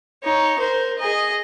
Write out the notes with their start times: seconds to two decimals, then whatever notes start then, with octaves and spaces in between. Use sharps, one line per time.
0.24 D#4 C#5
0.59 A#4 C5
0.99 G#4 D#5